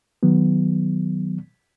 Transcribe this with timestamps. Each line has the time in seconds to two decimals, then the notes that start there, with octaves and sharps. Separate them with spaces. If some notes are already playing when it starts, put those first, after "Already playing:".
0.23 D#3 F#3 B3